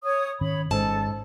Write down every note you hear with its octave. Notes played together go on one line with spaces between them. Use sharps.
C#5 D#6
G#2 D#3 C#4 C#5 B5
G#1 G#2 C#4 A4 A5